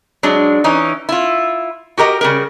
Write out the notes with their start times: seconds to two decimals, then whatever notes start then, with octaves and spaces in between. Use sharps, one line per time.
0.23 F#3 G#3 D4
0.64 E3 C#4 D#4
1.09 E4 F4
1.98 F#4 G4 A#4 D#5
2.21 C#3 G3 A#4